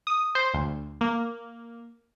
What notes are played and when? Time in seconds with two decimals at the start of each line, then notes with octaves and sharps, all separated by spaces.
0.07 D#6
0.35 C5
0.54 D2
1.01 A#3